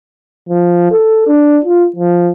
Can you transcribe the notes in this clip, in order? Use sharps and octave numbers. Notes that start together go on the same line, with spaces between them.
F3
A4
D4
F4
F3